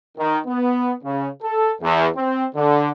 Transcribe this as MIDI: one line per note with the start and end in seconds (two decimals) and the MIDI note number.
0.18 0.39 51
0.47 0.94 59
1.04 1.28 49
1.42 1.74 69
1.82 2.08 40
2.16 2.46 60
2.56 2.90 50